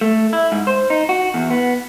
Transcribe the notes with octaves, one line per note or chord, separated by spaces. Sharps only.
A3
E4
G#2
C5
D#4
F#4
E2
B3